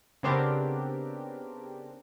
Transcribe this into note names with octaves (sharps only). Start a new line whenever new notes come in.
C#3 B3 C4 D4 G4 A#4